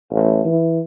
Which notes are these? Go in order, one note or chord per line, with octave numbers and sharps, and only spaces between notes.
A1
E3